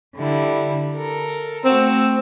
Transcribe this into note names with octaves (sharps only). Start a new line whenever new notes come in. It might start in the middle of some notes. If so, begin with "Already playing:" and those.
D3 G3 E4
A4 A#4
A3 C4 F#4 E6